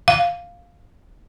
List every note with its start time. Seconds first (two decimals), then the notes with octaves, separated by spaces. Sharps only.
0.08 F5